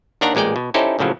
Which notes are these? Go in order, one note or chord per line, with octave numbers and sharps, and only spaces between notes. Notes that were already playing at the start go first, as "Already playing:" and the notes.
D#2 D#3 D4 D5 F#5 A#5
A1 A#2 G#3 D5 G5
B2
C#4 D#4 E4 G4 A4 C5
A#1 A2 C#3 F3 F#3